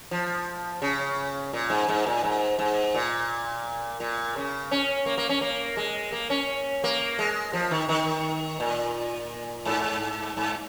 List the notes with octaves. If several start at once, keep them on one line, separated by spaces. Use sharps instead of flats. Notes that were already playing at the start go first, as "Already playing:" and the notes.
F3
C#3
A#2
G#2
G#2
A#2
G#2
G#2
A#2
A#2
C#3
C#4
A#3
A#3
C#4
A#3
G#3
A#3
C#4
A#3
G#3
F3
D#3
D#3
A#2
G#2
G#2